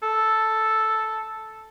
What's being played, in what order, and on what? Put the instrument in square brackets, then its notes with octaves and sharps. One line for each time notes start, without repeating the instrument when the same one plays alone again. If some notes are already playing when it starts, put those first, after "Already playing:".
[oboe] A4